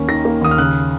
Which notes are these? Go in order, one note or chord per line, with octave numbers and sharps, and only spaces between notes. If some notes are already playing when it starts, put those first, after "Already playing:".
Already playing: D#2 A#3 C#4
D#3 A#6
A#3
D#2 D#6
F6
C#3 F#6